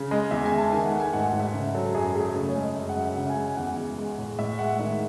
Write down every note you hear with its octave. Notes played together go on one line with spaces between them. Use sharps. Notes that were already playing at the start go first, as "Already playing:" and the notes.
Already playing: C#3
G#3 D#5
E2 E5
G#5
E2
A5
D#3 G#5
F#5
A3
G#5
G#2 F#5
F#5
G#2
E5
C#3
F#3 A4
F#2 G#4
A3 G#4
C#3 A4
C#5
G#3
D#5
F#2
F#5
F#2
E5
C#3 F#5
G#5
G#3
G#5
E2 F#5
E2
G#3
A2
A2 E5
G#3 F#5
D#3 E5